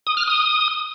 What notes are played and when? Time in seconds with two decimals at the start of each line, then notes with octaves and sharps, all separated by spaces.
0.07 D#6
0.17 F6
0.27 D#6